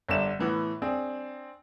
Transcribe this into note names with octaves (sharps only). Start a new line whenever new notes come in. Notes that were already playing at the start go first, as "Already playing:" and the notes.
G1 D3 D5 E7
A2 E3 B3
C4 D4 G#4